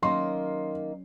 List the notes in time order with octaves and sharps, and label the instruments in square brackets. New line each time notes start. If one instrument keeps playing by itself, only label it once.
[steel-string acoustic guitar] D#3 A#3 A#4 [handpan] F#3 C#4 [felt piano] C6